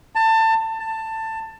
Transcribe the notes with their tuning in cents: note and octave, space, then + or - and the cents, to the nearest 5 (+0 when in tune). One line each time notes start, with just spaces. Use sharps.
A5 +25
A5 +15